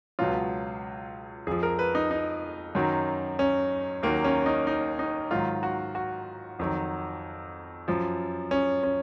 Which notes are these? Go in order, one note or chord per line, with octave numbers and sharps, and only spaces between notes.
C#2 B2 F#3 F4
F2 F3 G#4
A#4
B4
D#4
D#4
F#2 D#3 F#3
C#4
D#2 D#3 F#3 A#3
C#4
D#4
D#4
D#4
G#2 D#3 F#3 F4
F#4
F#4
F2 D#3 F#3
F#2 F3
C#4
C#4